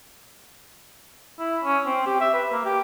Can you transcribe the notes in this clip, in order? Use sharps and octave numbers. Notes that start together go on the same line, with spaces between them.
E4
C#4
C4
G4
E5
B4
A#3
G4